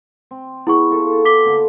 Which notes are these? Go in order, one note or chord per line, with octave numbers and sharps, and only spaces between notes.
C4
B3 E4 G#4 C#6
F4 A4
D6 B6 G7
D3 A#3